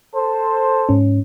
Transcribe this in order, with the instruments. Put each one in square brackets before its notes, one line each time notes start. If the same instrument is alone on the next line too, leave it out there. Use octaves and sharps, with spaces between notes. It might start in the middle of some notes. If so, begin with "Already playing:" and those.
[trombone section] A4 C5
[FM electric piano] G#2 C#4